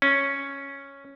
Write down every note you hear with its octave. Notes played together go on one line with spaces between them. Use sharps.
C#4